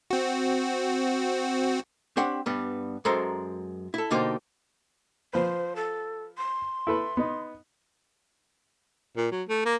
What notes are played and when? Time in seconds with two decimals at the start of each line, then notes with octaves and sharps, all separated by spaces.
0.10 C4 F#4
2.17 C4 D4 G4 C#5 F#5
2.46 G2 G3 B3
3.05 F#2 G#3 A4 A#4 C5 A#5
3.94 E4 A4
4.11 B2 D3 A#3 D#4 G4 C5
5.33 F3 B4 C5
5.76 A4
6.38 C6
6.87 E4 A4 B4
7.17 B3 D#4
9.17 A#2
9.32 F#3
9.49 A3
9.66 A#3